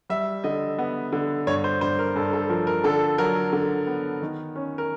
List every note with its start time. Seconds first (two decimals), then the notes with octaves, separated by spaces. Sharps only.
0.10 G3 E5
0.44 D3 D#5
0.78 B3
1.13 D3
1.47 G2 C#5
1.64 C5
1.81 G2 C5
1.99 A#4
2.16 G2 A4
2.33 A4
2.50 F3 A#4
2.67 A#4
2.84 D3 A4
3.18 F#3 A#4
3.53 D3
3.87 B3
4.22 D#3
4.56 C#4
4.78 A#4